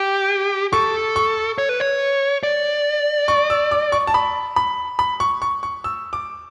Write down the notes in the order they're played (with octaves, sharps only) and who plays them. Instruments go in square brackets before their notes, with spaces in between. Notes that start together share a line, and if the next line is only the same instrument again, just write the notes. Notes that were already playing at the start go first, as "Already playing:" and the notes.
Already playing: [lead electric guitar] G4
[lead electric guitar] A4 [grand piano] C#6
[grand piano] C#6
[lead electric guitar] C#5
B4
C#5
D5
[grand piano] C#6
E6
D6
C#6
A5
B5
B5
B5
C#6
C#6
C#6
E6
D6